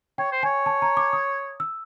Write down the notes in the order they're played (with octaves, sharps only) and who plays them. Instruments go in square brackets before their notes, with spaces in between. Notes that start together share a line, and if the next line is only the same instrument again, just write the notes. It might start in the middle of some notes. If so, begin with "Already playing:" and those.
[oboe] C#5 [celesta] G5
[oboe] C5
[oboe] C#5 [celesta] G#5
[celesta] A5
A#5
D6
D#6
E6